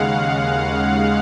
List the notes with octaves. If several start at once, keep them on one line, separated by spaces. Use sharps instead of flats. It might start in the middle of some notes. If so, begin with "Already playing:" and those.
Already playing: D#2 C#3 G#3 F5 F#5